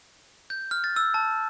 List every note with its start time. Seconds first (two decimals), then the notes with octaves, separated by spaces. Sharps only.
0.50 G6
0.71 F6
0.84 A6
0.96 E6
1.14 A5